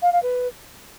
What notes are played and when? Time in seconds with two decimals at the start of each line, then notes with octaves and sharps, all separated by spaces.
0.02 F5
0.12 F5
0.22 B4